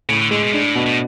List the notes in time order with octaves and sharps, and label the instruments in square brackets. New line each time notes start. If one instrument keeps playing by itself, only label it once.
[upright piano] A2 [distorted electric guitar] C#3
[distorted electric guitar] D3
[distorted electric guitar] D3 [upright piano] G#3
[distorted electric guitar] B2
[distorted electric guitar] A2 [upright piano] D4
[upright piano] B2
[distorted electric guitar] A2